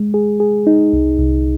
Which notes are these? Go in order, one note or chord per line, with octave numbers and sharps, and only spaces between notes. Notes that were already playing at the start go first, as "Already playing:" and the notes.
Already playing: G#3
G#4
G#4
D#4
C2
C2